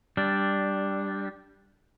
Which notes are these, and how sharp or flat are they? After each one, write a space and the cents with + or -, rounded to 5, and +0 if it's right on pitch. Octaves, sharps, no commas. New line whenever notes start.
G3 +0 D4 +0